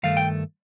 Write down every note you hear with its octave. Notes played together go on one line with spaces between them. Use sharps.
G2 D#3 A3 F5
G5